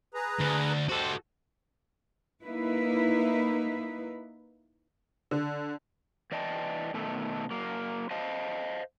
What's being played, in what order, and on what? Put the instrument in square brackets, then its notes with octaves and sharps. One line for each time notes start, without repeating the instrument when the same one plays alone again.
[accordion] G#4 B4 A#5
[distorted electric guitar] D2
[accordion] G#3 G4 C5 [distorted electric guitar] F#4 A4
[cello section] A#3 D#4 E4 B4
[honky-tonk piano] D3
[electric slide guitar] E3 D5 D#5 G5 A5
B2 D#3 A3 A4
F#3 A#3
C5 D#5 F5 A5